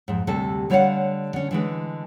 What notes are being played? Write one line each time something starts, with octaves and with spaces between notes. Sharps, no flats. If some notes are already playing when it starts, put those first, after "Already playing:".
F2 G#2
D2 C3 G3 G#4 A4
D3 G3 C#5 D#5 F5 F#5
D3 C#4
D3 E3 G#3